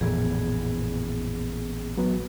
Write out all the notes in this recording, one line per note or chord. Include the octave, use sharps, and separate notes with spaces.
A1 F2 A#2 E3 B3 G#4
F#3 B3